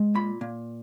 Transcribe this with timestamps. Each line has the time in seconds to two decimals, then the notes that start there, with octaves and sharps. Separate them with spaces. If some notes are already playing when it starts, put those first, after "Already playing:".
Already playing: G#3
0.15 A#2 B5
0.41 A#2